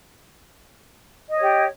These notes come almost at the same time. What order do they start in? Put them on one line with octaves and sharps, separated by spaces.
D#5 C#5 G4